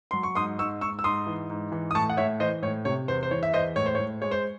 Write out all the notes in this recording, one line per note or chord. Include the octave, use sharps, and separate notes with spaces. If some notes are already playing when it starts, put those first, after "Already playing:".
F#3 C6
C#6
G#2 C6 D#6
G#2 C#6 E6
G#2 C#6 E6
E6
G#2 C6 D#6
E3
G#2
E3
D#6
A2 A5 C#6
F#5
A2 C#5 E5
E3 C5 D#5
A2 C#5
C3 C#5
E2 C5
C5
E3 C#5
E5
E2 C5 D#5
A2 C#5
C5
C#5
A2
G#3 C#5
C5